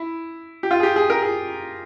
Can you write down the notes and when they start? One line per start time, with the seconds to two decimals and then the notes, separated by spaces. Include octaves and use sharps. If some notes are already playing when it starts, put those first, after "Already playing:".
Already playing: E4
0.63 G4
0.71 F4
0.80 G#4
0.83 G4
0.96 G#4
1.10 A#4
1.22 G#4